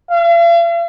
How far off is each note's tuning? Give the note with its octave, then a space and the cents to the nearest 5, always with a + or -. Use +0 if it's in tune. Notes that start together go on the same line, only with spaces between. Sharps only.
F5 -45